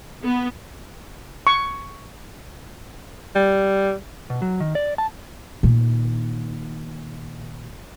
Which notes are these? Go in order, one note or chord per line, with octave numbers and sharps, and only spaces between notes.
B3
C#6
G3
B2
F#3
D#3
D5
A5
A#2 D#3